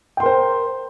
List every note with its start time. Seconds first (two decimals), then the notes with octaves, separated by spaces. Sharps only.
0.17 G5
0.20 C6
0.23 A#4
0.26 C5